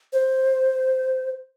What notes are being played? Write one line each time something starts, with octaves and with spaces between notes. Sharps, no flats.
C5